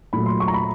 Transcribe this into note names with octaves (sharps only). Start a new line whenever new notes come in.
A#2 F#3 A3 B5
C6
C#6
A#5
B5